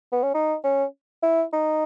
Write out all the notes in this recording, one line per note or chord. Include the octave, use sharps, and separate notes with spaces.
B3
C#4
D#4
C#4
E4
D#4